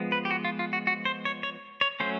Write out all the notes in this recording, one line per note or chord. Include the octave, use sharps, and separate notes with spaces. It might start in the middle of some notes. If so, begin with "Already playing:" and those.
Already playing: F3 G#3 B3
B4
G4
F#4
F4
F4
F#4
F#4
C5
C#5
C#5
C#5
F#3 A3 C#4 C5